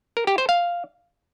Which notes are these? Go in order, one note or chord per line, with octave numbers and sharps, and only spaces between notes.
A#4
G4
C5
F5